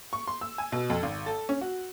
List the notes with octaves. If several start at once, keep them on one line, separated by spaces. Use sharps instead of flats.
C#6
C6
E6
G#5
B2
F2
G#1
A4
C#4
F#4